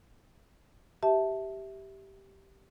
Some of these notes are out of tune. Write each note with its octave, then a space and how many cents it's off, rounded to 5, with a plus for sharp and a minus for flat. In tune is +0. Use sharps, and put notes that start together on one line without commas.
G4 -10 E5 -15 A5 +0